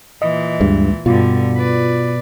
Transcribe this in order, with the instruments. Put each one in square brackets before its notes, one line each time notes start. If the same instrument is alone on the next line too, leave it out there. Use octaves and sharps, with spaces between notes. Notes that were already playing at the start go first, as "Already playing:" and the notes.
[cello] A#2 E3 [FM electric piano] D#5
[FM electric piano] D2 G#3 [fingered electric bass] G2
[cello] G2 D3 [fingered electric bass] B2 [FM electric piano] F4
[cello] B4 D5